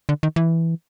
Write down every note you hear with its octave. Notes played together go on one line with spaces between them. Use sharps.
D3
D#3
E3